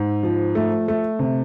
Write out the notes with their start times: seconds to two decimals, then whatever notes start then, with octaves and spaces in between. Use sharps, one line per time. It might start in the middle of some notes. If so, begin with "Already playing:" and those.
Already playing: G#2
0.23 F3
0.55 A3
0.88 A3
1.19 C3